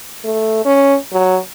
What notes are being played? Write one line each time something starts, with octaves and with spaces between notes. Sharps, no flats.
A3
C#4
F#3